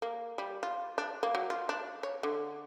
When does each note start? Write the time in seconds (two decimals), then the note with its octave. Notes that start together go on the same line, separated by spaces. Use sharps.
0.02 A#3
0.38 G3
0.63 F4
0.98 D4
1.23 A#3
1.35 F#3
1.50 F4
1.69 D4
2.03 C#5
2.23 D3